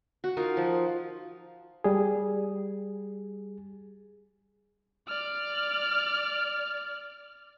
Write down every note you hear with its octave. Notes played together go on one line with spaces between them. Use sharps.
F#4
D#4 F4 A#4
F3
G3 G#4
D5 F6